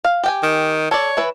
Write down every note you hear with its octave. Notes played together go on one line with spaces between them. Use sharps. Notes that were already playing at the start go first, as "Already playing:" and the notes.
F5
G4 G5 G#5
D#3
A4 C#5 D5
E3 E4 B4